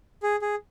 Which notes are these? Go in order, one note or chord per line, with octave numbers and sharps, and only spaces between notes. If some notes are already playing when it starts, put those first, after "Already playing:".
G#4
G#4